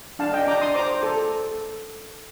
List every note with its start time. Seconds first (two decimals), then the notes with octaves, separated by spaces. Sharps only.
0.19 D4 F5 A5
0.33 D#5 G5
0.47 D4 A#5 D6
0.61 C6 D#6
0.75 C5 A#5 D6
1.03 A4